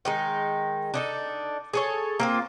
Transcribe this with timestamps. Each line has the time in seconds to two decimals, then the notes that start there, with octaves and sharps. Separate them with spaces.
0.05 D#3 G#3 D#4
0.94 D4 D#4 A4
1.73 G#4 A4 C#5
2.20 A#3 C4 F4